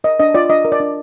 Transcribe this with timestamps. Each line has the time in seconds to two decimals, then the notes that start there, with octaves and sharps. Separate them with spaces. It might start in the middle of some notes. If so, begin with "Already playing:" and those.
0.04 A#4 D#5
0.20 D4 D#5
0.35 F4 D5
0.50 D4 D#5
0.65 A#4
0.72 D5
0.80 D4